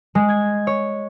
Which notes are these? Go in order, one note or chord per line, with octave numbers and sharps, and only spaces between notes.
G#3
G#6
C#5